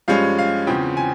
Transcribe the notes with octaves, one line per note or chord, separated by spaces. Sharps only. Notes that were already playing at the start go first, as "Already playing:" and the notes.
G2 F3 G#3 C#4 F5
F5
E2 C#3 F3 C4 G5
G#5